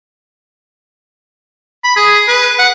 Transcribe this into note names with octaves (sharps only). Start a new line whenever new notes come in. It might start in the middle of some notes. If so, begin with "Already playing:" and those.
B5
G#4
B4
F#5